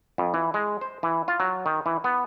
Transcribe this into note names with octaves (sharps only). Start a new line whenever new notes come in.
F2
E3
G#3
C5
E3
F4
F#3
D#3
E3
B3